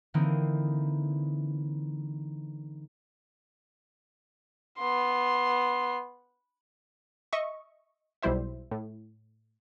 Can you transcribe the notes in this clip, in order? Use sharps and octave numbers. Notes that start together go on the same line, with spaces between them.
D3 E3 A#3 C4 D#4
B3 C6
D#5 E5 C#6
B1 B2 G3 E4 C5 E5
A2